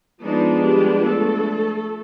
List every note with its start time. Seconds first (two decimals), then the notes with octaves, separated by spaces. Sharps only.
0.23 F3 G#3 B3 D4 D#4
0.65 G3 G4
1.07 A3 A4